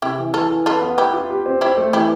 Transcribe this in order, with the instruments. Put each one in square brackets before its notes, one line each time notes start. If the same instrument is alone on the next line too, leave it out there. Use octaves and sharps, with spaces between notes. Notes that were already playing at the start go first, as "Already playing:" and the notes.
[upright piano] C3 [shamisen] E4 G4
[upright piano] E3
[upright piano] E3 [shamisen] F4 A4
[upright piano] E3
[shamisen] F4 A4 [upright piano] B4
[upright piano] B3
[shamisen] E4 G4 [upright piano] B4
[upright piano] F4
G4
C4
[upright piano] C4 [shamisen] E4 G4
[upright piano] A3
[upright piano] E3 [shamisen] E4 G4